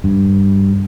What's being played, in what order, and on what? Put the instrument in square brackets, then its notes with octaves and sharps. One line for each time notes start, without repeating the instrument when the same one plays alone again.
[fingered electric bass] G2